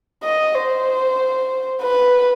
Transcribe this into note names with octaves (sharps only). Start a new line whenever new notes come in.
D#5
C5
B4